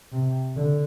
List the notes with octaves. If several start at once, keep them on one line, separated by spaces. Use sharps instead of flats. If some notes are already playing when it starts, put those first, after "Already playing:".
C3
D3